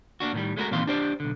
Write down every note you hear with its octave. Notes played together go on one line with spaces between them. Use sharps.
A#3 D4 F#4
A2 D#3 G3
G#3 A3 C#4 E4 F#4 A#4
A#2 D#3 E3 C4 F5 C6
D4 G4 C5 D5
B1 D3